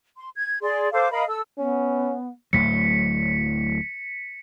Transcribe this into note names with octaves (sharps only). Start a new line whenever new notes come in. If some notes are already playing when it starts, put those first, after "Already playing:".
C6
G#6
G#4 D5 C6
A4 C5 F5 D6
A#4 D#5 F5 B5
A4 E6
B3 C#4
D1 A2 F#3 B6 C#7